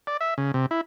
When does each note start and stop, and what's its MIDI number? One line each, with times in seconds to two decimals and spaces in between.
0.07 0.17 74
0.21 0.34 76
0.38 0.52 49
0.54 0.66 48
0.71 0.81 64